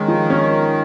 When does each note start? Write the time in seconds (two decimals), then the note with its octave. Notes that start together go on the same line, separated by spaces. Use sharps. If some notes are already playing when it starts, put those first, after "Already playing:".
Already playing: D#3 G#3 C#4
0.08 F3
0.30 C#4